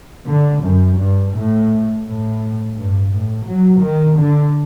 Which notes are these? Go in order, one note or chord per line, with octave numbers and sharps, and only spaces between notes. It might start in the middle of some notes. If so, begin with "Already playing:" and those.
D3
F#2
G2
A2
A2
G2
A2
F#3
D#3
D3